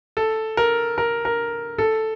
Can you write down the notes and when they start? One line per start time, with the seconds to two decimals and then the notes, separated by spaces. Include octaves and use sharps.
0.17 A4
0.57 A#4
0.98 A#4
1.25 A#4
1.78 A4